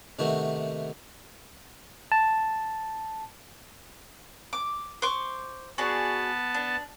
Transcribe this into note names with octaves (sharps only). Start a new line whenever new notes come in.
C3 D#3 A3 B3 F#4
A5
D6
C5 C#6 D6
B3 F#4 G#4 D5 A5
D4